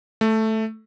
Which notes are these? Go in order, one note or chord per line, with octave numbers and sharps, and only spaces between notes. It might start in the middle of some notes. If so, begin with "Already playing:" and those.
A3